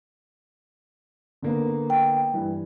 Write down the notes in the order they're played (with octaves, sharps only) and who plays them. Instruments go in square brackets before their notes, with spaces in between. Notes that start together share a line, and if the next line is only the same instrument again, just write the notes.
[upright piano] D3 A#3 B3
[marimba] G5
[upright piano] G2 E3